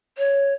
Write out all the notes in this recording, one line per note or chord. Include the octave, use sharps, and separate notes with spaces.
C#5